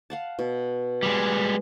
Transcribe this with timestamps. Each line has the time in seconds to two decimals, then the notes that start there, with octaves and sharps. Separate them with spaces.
0.10 F5 F#5 A5
0.39 B2
1.03 G3 G#3